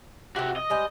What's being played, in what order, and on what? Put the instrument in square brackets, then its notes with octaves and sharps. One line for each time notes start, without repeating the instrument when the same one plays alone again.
[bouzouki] C3 C4 [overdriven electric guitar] F#4 G4
[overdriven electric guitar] D#5
[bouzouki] G3 G#3 C5